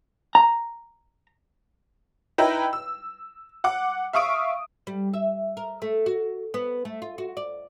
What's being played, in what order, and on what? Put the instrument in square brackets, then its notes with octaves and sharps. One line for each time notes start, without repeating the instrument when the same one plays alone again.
[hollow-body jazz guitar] A#5
[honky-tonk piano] D#4 E4 B4 G5 A#5
E6
F#5 D6
E5 F5 C#6 D#6 D7
[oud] G3
E5
A#4
A3
F#4
B3
A3
F4
F#4
D5